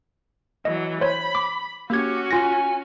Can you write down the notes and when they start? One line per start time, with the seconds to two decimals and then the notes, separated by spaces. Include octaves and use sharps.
0.65 E3 F#3 D#5
1.01 C5 C#5 B5
1.35 D6
1.90 A#3 C#4 F#4 G4 G#6
2.31 F4 G#5 A#6